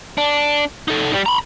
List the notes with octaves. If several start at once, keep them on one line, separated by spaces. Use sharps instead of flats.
D4
D#4 A4
G3
A#5 B5